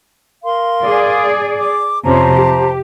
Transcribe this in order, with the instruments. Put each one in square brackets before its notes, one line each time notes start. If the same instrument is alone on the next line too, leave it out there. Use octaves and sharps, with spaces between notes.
[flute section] A#4 F5 C6
[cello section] G#4 D5
[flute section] D6
[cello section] F2 C3 C#4 [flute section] C5 A5 A#5
[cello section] G4